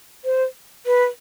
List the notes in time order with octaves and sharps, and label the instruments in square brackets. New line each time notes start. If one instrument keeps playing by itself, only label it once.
[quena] C5
B4